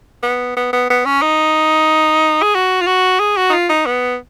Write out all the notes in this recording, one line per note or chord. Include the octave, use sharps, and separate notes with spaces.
B3
B3
B3
B3
C#4
D#4
G#4
F#4
F4
F#4
G#4
F#4
D#4
F4
D#4
B3